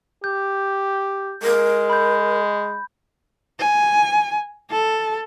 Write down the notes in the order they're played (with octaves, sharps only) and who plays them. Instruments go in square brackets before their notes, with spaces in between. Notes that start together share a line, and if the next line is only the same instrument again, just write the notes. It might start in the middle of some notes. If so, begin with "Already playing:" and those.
[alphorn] G4 [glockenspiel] G6
[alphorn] G#3 [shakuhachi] A#4
[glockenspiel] B5 G6
[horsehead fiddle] G#5
A4